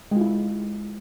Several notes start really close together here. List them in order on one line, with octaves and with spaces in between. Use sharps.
G#3 F4 E4